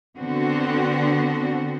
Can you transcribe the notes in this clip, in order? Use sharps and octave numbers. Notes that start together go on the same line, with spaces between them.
D3 B3 C4 F#4